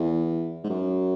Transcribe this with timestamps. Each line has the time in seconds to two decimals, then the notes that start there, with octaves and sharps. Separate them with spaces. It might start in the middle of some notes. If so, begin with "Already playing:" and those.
Already playing: E2
0.64 G#2
0.69 F#2